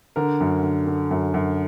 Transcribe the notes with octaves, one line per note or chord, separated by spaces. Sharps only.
D3 A#4
F#2
D3
D3
F#2
F#2